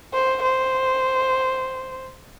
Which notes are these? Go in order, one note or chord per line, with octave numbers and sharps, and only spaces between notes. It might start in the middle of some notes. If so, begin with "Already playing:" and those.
C5
C5